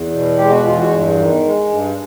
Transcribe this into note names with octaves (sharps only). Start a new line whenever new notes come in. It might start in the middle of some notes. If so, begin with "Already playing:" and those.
Already playing: E2
B2
G#3 G4
F#4
E2 F4
F#4
G2
D#3
G#3
G2